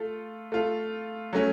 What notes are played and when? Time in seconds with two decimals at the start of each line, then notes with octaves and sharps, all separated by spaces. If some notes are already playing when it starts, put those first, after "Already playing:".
Already playing: A3 F4 A4
0.52 A3 F4 A4
1.33 F#3 A3 C#4